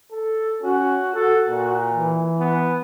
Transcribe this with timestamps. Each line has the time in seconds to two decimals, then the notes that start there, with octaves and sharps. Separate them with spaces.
0.11 A4
0.62 C#4 F#4
1.14 F#4 A4
1.48 A#2
1.90 E3
2.39 B3